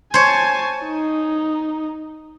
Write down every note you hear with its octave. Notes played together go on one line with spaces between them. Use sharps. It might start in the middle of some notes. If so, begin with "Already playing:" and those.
C5 C#5 G#5 A5
D#4